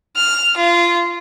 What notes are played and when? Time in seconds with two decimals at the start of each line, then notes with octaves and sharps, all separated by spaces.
0.16 F6
0.57 F4